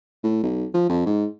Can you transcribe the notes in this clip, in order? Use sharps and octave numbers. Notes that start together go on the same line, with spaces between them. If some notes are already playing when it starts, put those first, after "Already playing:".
A2
B1
F3
F2
G#2